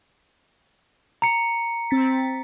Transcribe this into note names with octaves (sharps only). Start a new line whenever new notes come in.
A#5 C#7
C4 A6 B6